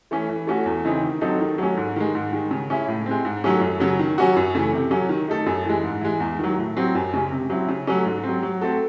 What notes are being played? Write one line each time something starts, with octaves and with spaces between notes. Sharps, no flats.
E3 A3 C#4
E3
A3 C#4 F#4
E2
C#3 E3 C4 D#4
D#3
F#3 C4 D#4 A4
D#3
F#3 A3 C#4
G#2
D#3 G#3
G#2
D#3 G#3
C#3
G#3 C#4 E4
A2
G#3 C4
G#2
D#3 F#3 A3 C#4
F#2
C#3 F#3
D#3
F#3 C#4 F#4
F#2
C#3 E3 A3
C3
F#3 C#4
D#3
A3 D#4 A4
F#2
E3 G#3
G#2
E3 G#3
E2
D#3 F#3
A2
F#3 C4
F#2
C#3 G#3 C#4
C3
F#3 C4 E4
C#3
F#3 A3 C#4
G#2
C4
F#3
F#3
A3 C4 F#4 A4